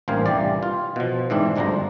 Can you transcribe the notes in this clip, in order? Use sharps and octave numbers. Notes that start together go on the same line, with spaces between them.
A1 G2 A#3 C5 F5 G#5
C2 E3 G4 D5
F4
B2 F3
G#2 E3 C4 D4
G1 D2 F3 D4 C5 A#5